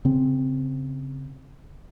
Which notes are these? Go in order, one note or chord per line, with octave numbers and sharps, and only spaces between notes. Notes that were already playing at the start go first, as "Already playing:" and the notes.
C#3 C4